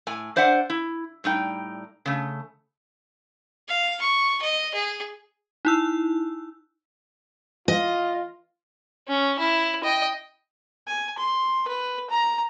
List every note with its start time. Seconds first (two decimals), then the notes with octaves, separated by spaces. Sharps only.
0.07 A2 G#5
0.36 D4 C5 D5 E5 F#5
0.70 E4
1.24 A2 G3 D#4 G5
2.06 C#3 A3
3.68 F5
4.01 C#6
4.42 D#5
4.74 G#4
5.65 D#4 E4 E6
7.68 F4 D#5
9.08 C#4
9.39 E4
9.84 D#5 G5
10.87 G#5
11.18 C6
11.68 B4
12.10 A#5